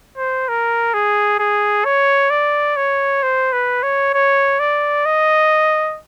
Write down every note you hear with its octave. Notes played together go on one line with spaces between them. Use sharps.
C5
A#4
G#4
G#4
C#5
D5
C#5
C5
B4
C#5
C#5
D5
D#5